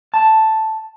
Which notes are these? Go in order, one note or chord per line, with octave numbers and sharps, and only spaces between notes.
A5